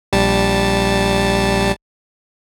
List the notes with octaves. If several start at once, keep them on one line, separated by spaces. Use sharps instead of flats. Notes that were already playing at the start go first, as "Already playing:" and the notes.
A#1 G3 A5